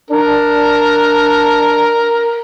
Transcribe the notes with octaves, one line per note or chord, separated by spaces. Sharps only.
D4 A#4